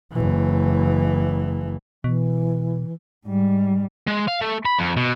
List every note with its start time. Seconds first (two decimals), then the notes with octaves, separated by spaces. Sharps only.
0.12 F#1 E3
2.04 B2 E3
3.26 G#2 G3
4.08 G#3
4.28 F5
4.41 A3
4.65 B5
4.79 F2
4.97 B2